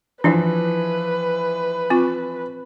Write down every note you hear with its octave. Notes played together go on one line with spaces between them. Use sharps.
E3 F3 D4 E4 B4 E5
C4 F4 C#6